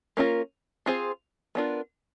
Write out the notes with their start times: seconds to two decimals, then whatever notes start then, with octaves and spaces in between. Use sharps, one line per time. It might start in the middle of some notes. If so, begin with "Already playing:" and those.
0.17 A#3 C#4 F4 A#4
0.86 C4 F4 G#4 C5
1.55 B3 D4 F4 A#4